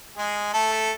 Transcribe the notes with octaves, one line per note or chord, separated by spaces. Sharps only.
G#3 G#4
A3 A4